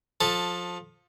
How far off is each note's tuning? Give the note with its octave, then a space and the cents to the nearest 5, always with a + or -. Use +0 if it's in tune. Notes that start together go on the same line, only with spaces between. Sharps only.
F3 +20 A4 +0